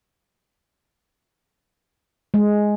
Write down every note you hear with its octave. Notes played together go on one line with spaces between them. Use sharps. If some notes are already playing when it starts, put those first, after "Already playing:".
G#3